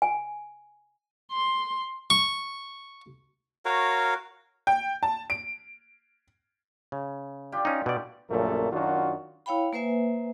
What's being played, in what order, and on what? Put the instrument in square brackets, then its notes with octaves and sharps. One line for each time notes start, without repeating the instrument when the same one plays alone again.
[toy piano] G#5
[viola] C6
[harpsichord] C#6
[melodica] F#4 A#4 C#5 F5
[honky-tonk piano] G5
A5
D7
[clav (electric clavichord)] C#3
[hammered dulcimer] D4 F4 G4
[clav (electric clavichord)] C#4 D#4
B2 D5
[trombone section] A#1 F#2 A#2 C#3 A3 A#4
F#2 D#3 F#3 D4 F4 F#4
[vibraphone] E4 C#5 F5 G5 B5
A#3 B4 C5 E5 G#5